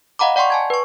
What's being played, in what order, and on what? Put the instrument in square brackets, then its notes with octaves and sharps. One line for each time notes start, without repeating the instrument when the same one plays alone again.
[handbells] D#5 F5 F#5 A#5 B5 D6
D5 F#5 G5 C6 C#6
G#5 A5 G#6
B4 C#6